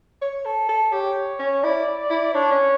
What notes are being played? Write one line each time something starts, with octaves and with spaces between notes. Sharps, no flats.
C#5
A4
A4
G4 C#5
C#4
E4 D5
E4
D4 C#5
C#4